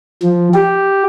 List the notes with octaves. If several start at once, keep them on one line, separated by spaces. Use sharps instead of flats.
F3
G4